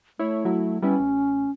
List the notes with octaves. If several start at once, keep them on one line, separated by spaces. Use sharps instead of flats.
A3 E4 C#5
F#3 E4
G3 B3 C#4 E4
A1